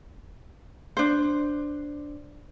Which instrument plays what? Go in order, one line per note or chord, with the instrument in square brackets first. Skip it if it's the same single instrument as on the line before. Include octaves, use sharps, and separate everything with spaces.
[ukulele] D4 C5